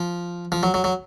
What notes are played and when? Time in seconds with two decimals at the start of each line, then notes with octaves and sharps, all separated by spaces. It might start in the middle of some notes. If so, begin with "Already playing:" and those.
Already playing: F3
0.52 F3
0.63 F#3
0.74 F#3
0.84 F#3